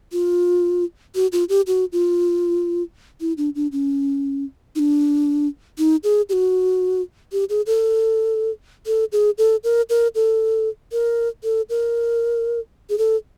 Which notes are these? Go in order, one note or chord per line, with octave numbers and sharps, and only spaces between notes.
F4
F#4
F4
G4
F#4
F4
E4
D4
D4
C#4
D#4
D4
D#4
G#4
G4
F#4
G4
G#4
A4
A4
G#4
A4
A#4
A#4
A4
A#4
A4
A#4
G#4
A4